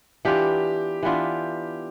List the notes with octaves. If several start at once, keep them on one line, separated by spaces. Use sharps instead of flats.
E3 B3 D4 F4 G4
E3 B3 D4 F4